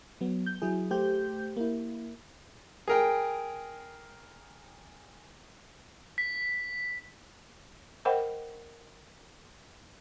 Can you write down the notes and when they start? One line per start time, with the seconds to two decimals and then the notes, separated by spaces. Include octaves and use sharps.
0.21 F#3 B3
0.46 G6
0.62 F#3 E4 G#4
0.91 A3 G4 C5 G6
1.57 A#3 E4
2.88 G#4 A#4 G5
6.18 B6
8.05 A#4 C5 D#5 F#5 G5 B5